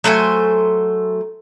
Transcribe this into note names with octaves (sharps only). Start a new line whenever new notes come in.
F#3 A3 C5 G#5